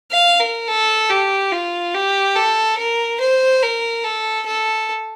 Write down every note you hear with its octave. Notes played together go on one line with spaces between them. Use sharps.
F5
A#4
A4
G4
F4
G4
A4
A#4
C5
A#4
A4
A4